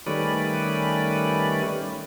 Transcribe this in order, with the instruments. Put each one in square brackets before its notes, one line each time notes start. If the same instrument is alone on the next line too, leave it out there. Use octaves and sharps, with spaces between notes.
[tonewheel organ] D#3 G3 A3 C#4 B4 D5